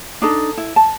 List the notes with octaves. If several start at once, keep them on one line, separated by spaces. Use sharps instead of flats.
D4 D#4 A4
E4
A5